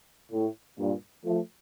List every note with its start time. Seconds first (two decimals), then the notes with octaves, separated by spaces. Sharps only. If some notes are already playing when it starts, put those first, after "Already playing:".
0.32 A2
0.79 G2 A#2
1.24 F3 A3